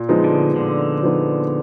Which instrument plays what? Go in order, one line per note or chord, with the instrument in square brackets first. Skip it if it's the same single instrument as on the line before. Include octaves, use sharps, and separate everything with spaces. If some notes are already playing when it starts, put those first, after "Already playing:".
Already playing: [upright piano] A#2
F3 G#3 B3 D#4
[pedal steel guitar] D3
[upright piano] A#2 [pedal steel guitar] D3
[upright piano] F3 G#3 B3 D#4